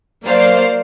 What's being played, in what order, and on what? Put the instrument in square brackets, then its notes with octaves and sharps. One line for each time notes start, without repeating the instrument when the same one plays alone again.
[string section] F#3 A#3 C5 D5 F5